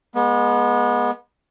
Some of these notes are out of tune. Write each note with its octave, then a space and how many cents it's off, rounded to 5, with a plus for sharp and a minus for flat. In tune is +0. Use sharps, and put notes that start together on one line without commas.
G#3 +0 B3 -30